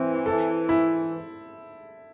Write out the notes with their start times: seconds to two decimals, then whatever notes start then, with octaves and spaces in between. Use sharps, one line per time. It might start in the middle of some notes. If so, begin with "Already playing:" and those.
Already playing: E3 C4
0.26 A4
0.69 E4